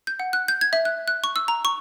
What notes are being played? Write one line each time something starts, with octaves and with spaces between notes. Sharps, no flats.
G6
F#5
F#6
G6
G#6
E5
F#6
F#6
C#6
E6
A#5
C#6